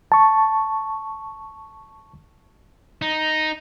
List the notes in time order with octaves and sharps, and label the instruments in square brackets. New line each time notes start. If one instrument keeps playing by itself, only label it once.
[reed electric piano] A5 C#6
[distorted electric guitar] D#4